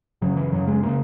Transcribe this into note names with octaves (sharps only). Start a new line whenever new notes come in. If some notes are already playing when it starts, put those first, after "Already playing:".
F#2 C#3 F#3
E3
F#2 C#3 F#3
G#3
C#3 A#3